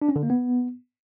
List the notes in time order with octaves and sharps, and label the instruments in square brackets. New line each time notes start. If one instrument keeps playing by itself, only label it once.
[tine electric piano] D4
C#4
D3
A#3
B3